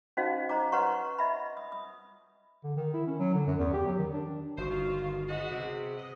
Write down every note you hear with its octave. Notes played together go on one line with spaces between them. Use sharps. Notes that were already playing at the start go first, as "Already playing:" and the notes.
C#4 D#4 F#4 C5 D#5 F5
C5 D#5 A#5 D6
B4 C#5 F#5 A#5 C6 C#6
D#5 E5 B5
D#6
D#6
D3
D#3
E4
C#4
F#3
D3
F#2
E2
G4
F#3
D#3
D4
G1 D#3 F#4 C5
F4
G#3 B3 F#4 D#5
C3 G#4
D#5